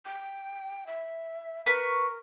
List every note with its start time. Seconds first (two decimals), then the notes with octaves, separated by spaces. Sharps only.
0.05 G5
0.87 E5
1.66 A#4 B4 C#6